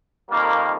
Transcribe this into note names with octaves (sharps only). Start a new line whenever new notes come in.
F2 D#3 G3 A#3